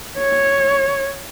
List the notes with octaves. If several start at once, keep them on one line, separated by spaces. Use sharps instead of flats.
C#5